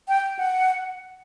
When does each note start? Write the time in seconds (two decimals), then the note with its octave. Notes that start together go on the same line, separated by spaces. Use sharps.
0.08 G5
0.39 F#5